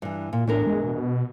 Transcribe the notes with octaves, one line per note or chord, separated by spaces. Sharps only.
G2 E3
A#2
E2 A2 D4 A#4
G#3
B2